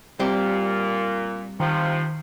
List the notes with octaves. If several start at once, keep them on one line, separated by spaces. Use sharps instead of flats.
A#2 G3 C4 G4
C3 D#3 F3